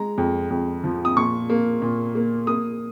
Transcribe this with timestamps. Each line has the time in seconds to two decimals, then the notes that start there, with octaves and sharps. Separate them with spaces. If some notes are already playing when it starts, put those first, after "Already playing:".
Already playing: G#3 A#5
0.18 F2
0.51 F2
0.84 F3
1.05 D#6
1.16 A#2 C#6
1.50 A#3
1.82 A#2
2.15 A#3
2.47 A#3 D#6